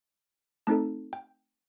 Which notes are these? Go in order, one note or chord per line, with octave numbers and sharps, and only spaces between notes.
A3 C4 D#4 A4 A5
G5